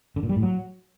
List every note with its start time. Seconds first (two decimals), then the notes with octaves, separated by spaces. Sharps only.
0.16 D3
0.23 A#2
0.29 G3
0.36 A2
0.43 F#3